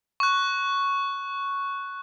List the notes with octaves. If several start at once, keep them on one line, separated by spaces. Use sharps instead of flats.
C#6 F#6